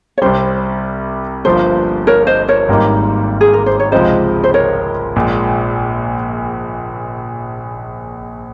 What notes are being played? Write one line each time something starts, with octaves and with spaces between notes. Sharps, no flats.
C#5
C2 C3 G3 C5
G1 G2 F3 A#3 C5
A#4 C#5
C5 D#5
A#4 C#5
G#1 G#2 G3 A#3 D#4
G#4
A#4
C5
C#5
C#2 C3 F3 G#3 C5 D#5
C5
A#4 C#5
A#1 A#2 G#3